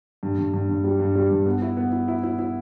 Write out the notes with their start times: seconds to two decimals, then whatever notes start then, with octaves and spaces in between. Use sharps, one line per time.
0.23 G2
0.38 G2
0.53 G2
0.69 G2
0.84 G3
1.00 G2
1.15 G3
1.31 G2
1.46 B3
1.62 E4
1.77 B3
1.92 E4
2.08 E4
2.23 E4
2.39 E4